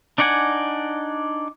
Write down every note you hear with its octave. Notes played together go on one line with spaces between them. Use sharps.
D4 D#4 D5 F#5 G#5